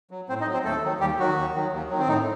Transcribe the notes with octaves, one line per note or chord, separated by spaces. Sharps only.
F#3
A2 C4 C5
D#4 D#5
F#3
C4 C5
D#2 A3 A4
D#3 F#3
D#2 G3 G4
D#3 F#3 F#4
D#2
D#3 F#3
D#2
D#3 F#3
C4
A2 D#4